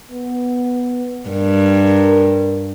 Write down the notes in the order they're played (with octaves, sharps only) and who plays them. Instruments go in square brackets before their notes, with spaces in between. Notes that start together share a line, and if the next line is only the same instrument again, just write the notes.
[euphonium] B3
[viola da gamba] G2 [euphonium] A#4